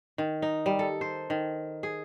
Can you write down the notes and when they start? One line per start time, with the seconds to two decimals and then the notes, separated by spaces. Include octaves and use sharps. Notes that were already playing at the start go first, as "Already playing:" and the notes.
0.18 D#3
0.42 D#4
0.66 G3
0.79 A4
1.01 C5
1.30 D#3
1.83 G#4